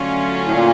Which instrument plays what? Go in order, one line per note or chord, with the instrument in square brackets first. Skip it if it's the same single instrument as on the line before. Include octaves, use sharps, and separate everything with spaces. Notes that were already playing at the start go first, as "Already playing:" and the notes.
Already playing: [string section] D3 F#3 A3 C#4 F4
[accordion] A2
A#2